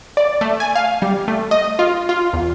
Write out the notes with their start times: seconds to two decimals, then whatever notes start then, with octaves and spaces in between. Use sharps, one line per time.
0.17 D5
0.41 A3
0.60 G#5
0.76 F5
1.02 G3
1.28 A3
1.51 D#5
1.79 F4
2.09 F4
2.33 E2